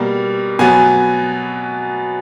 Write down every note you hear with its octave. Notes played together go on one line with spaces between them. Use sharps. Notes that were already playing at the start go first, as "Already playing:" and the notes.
Already playing: B2 G3 A#3
B2 F#3 B3 G#5